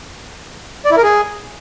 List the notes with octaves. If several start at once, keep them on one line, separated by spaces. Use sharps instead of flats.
D5
E4
A#4
G#4